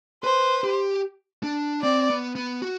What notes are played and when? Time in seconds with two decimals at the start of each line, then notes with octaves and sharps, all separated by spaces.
0.24 B4 C5
0.64 G4
1.43 D4
1.82 C4 D5
2.10 B3
2.35 B3
2.62 F#4